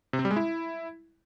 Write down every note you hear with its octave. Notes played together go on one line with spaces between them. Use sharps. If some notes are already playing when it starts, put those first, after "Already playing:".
C3
C4
G3
G#3
E4